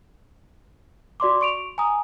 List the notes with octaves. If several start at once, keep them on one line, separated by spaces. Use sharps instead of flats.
F#4 D5 C6 D6
C#6 D7 F7
G#5 A#5 D#6